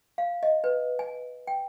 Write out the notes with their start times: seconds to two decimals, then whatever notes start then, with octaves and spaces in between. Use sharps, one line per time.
0.18 F5
0.43 D#5
0.64 B4
0.99 G#5
1.47 G5